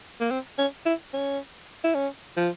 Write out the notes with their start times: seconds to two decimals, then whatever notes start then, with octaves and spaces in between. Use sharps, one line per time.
0.21 A#3
0.31 C4
0.58 C#4
0.86 E4
1.14 C#4
1.84 E4
1.95 C#4
2.37 F3